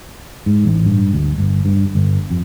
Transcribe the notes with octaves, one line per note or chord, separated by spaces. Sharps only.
G#2
A1
G2
D2
G1
G2
G1
F2